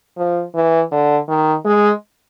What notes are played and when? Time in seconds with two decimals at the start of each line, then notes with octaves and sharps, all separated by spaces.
0.17 F3
0.55 E3
0.91 D3
1.28 D#3
1.65 G#3